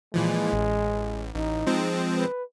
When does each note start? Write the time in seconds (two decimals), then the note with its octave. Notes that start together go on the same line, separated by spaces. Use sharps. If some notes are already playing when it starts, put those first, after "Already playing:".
0.14 A#2 E3 F3 G#3
0.52 A1
1.35 A1 D#4
1.67 F3 G#3 C4
2.17 B4